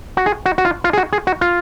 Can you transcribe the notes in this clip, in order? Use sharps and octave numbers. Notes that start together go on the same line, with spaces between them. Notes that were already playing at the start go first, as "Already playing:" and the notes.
F#4
G#4
F#4
F#4
F4
F4
G#4
F#4
G#4
F#4
F4